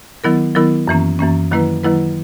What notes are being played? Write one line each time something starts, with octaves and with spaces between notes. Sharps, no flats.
D#3 F#3 B3 E4 A#4
D#3 F#3 B3 E4 A#4
F#2 E3 A#3 C#4
F#2 E3 A#3 C#4
D#3 F#3 A#3 E4 B4
D#3 F#3 A#3 E4 B4